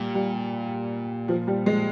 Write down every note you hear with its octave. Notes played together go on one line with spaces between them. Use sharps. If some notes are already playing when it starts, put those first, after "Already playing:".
Already playing: A#2 G3
G3
F3
G3
G#3